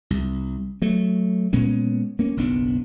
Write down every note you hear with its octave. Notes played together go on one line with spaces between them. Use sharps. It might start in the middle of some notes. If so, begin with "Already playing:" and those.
C2
F#3 A3
A#2 G#3 B3 C#4
A#3 C#4
F#1 B1 B3 D4